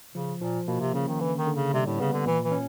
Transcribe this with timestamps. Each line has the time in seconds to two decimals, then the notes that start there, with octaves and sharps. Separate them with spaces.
0.15 C#3 F3
0.41 A#2 F3
0.67 B2 A#3
0.80 C3
0.94 C#3 C#4
1.08 D#3
1.20 D3 E3
1.38 D#3
1.47 D3
1.56 C#3
1.73 C3 G3
1.86 A2
2.00 C#3 B3
2.13 D3
2.26 A#2 E3
2.44 E3
2.52 C#4